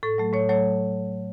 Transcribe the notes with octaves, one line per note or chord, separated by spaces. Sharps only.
A2 A4
F#3 A3
A2 C#5
F#3 A3 C#5